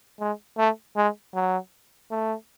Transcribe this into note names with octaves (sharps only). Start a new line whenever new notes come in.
G#3
A3
G#3
F#3
A3